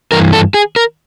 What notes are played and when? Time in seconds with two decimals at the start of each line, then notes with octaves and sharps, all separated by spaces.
0.12 G2 E3 A#4
0.33 A4
0.54 G#4
0.76 A#4